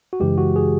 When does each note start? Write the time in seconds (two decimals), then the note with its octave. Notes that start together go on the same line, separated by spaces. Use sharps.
0.13 F#4
0.20 F#2 C#3 E3 G#3 G4
0.38 F#4
0.56 G#4